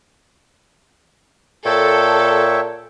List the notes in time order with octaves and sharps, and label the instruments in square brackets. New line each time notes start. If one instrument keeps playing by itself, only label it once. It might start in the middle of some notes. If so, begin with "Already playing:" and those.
[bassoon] A#2 [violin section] A4 [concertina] C#5 E5 G5